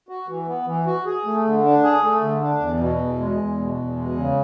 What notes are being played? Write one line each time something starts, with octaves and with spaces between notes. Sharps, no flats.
F#4
E3
B3
E3
F#4
G#4
A3
D3
D4
G#4
A3
D3
D4
E2
B2
E2
G#3
E2
B2
E2
G#3
C#3